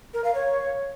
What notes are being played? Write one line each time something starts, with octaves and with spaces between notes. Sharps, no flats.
A#4
F5
C#5